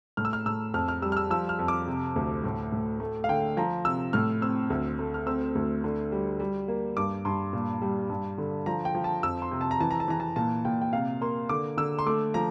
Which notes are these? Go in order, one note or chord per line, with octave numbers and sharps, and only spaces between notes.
A2 F6
E6
F6
A2 E6
F2 F6
F6
G3 E6
F6
E6
F3 E6
F6
F2
D6
C3
D2
A2
A2
A3
F5
D3 G5
F3 A#5
C3 E6
A2 F6
C4 E6
D2
A3
F6
C4 E6
D2
D3
G3
G3
A#3
G2 D6
G2 C6
A#2
G3
G2
D3
F3 A#5
G5
F3
A5
F2 E6
C6
C3
A5
A#5
E3 A5
A#5
A5
E3 A#5
A5
A#2 A5
A#2 G5
G5
C3 F5
A#3 C6
D3 D6
D3 E6
C6
A3 D6
F3 A#5